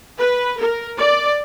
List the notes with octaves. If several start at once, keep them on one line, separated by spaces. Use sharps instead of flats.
B4
A#4
D5